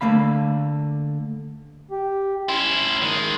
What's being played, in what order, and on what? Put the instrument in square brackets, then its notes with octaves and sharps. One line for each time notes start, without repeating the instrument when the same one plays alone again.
[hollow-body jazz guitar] D3 A3 A#3 F5 B5
[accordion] G4
[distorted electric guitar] C#4 E4 [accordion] C6
[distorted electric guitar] D#3 G#3